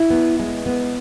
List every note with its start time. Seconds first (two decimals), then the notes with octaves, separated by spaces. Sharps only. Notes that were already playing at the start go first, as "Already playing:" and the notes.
Already playing: E4
0.10 B3
0.39 G#3
0.66 B3